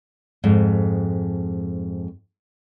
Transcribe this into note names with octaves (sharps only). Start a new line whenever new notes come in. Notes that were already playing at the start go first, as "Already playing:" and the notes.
F2 G#2